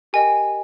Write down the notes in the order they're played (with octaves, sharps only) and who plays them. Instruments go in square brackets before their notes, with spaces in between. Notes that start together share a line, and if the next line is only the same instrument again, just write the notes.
[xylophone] G4 A#4 D#5 G5 G#5